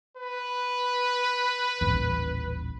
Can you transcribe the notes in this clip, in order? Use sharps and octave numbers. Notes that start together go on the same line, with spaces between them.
B4
D#1 A1